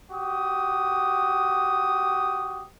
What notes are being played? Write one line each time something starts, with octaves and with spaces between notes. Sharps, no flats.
F#4 G4 D#6